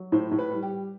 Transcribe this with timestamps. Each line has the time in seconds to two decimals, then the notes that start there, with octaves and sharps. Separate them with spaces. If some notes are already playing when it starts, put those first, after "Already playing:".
Already playing: F#3
0.12 A2 C5
0.32 A2
0.39 B4
0.51 G3
0.63 G4
0.69 G3